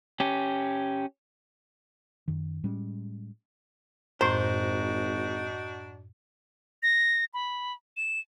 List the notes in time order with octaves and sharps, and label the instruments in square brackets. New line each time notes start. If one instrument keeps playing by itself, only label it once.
[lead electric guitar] C#4 G4
[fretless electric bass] F#2 D#3
A2 G3 G#3 C#4
[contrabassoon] G#1 [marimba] F#2 A2 [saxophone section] D4 D#4 F#4 [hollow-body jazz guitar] C5
[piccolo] A#6
B5
E7